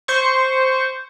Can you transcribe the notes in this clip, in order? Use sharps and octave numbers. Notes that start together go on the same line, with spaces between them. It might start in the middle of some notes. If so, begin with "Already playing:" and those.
C5 C#6